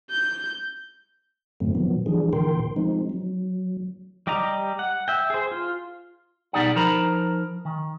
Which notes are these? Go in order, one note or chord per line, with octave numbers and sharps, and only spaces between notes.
G6
F#2 A2 D3 F#3 A3 C4
A#2 D#3 F3 F#3 B3
E3 F3 G3 D4 G#4
A#2 D3 E3 A#4 G5 C6
F3 G#3 C4 D#4
F#3
G3 G4 D#5 A#5
F#5
E5 G5
G#4 C5
F4
B2 G3 D#4 G#4 D5 F#5
F3 D#4 A#4 C5 A#5 B5
D#3